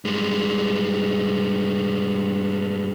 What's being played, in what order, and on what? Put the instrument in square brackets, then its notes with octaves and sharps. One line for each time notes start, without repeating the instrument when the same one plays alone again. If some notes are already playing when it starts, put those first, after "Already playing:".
[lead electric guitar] G2 G#3